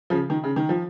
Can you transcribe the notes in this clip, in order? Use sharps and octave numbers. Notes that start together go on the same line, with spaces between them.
C#3 F3
D#3
C#3
D#3
F3